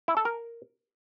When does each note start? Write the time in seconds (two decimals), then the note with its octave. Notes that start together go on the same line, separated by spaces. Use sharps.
0.08 E4
0.17 A4
0.25 A#4